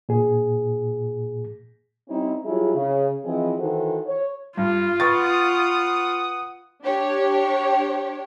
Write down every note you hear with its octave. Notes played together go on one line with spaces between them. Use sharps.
A#2 G#4
G3 C4 C#4 D#4 E4
F#3 G3 E4 F4 G#4
C#3
E3 F3 C4 E4 G#4 D#5
D#3 E3 F#4 A4 C5
C#5
G2 F4
B4 F#5 C#6 D#6 A6
D4 G4 C#5